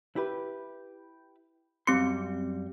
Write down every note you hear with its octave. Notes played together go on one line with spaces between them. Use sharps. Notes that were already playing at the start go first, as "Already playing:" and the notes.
E4 G4 B4
F#2 G3 C4 C6 C#7